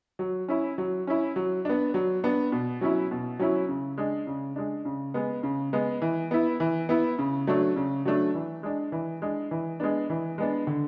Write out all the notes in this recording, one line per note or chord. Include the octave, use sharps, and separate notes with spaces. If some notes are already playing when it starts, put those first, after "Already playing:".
F#3
C#4 E4
F#3
C#4 E4
F#3
B3 D4
F#3
B3 D4
B2
F#3 C#4 E4
B2
F#3 C#4 E4
C#3
G#3 D4
C#3
G#3 D4
C#3
G#3 B3
C#3
G#3 B3
E3
B3 E4
E3
B3 E4
C#3
F#3 A3 D4
C#3
F#3 A3 D4
E3
G#3 D4
E3
G#3 D4
E3
G#3 B3 D4
E3
G#3 B3 D4
D3